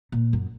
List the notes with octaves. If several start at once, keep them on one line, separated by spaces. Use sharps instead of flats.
A#2
F#2